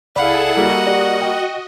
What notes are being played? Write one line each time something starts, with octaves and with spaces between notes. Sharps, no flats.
C#2 E4 G#4 A4 D5 F5 F#5 B5
G3 A#3 F#4 D#5
G4 D5
G5